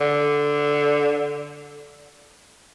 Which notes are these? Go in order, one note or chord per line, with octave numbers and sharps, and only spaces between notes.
D3